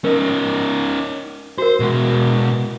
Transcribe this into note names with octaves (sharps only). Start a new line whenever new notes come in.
C#4 D#4 A#4
F#4 A#4 C5
B2 G#3